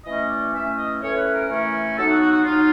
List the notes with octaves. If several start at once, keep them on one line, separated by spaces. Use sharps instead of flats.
E3 A3 C#4 D#5
D5
E3 A3 C#4 E5
D#5
E3 A3 C#4 C#5
B4
A#4
E3 A3 C#4
F#3 B3 D#4 A4
F#4
F#4
F#4
F#3 B3 D#4 F4